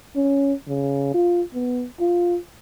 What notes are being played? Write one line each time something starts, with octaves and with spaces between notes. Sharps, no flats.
C#4
C#3
F4
B3
F4